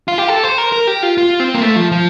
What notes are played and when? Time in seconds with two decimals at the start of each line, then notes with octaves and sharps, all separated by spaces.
0.08 F4
0.18 G4
0.28 A4
0.44 C5
0.58 A#4
0.72 A#4
0.87 G4
1.03 F4
1.18 F4
1.40 C4
1.55 A#3
1.61 A3
1.76 F3
1.92 F3